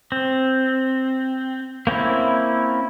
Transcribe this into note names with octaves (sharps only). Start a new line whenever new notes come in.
C4
A#3 C4 C#4 E4